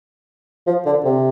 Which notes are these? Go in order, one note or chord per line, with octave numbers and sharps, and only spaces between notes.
F3
D3
C3